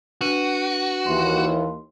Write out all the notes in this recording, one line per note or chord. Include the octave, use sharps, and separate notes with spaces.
D4 F#4 B4 D#7
D#2 E3 C6